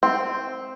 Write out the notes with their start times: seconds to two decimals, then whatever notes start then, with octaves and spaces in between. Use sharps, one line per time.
0.03 C4